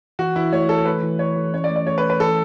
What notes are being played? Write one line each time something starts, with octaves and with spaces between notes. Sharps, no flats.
E3 F#4
E3 E4
A3 C#5
E3 A4
A3 B4
E3
E3 C#5
E3
C#4 C#5
D5
A3
D5
A3 C#5
B4
A3
B4
E3 A4